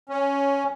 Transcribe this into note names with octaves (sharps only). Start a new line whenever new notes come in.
C#4